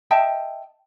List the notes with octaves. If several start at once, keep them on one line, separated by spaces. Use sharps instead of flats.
D#5 E5 G5 A5